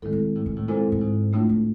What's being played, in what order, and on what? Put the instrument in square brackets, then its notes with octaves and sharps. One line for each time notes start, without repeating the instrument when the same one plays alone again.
[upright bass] A2 [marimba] D#3 G#3 C4 E4 A4
[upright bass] A2
A#2
A2
A#2
A2
[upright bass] A#2 [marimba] G#3 C4 E4 A4 C5
[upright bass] A2
G#2
[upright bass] A2 [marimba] A3 D4 F4
[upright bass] A2